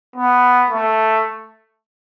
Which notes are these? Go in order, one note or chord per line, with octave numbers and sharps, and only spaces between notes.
B3
A3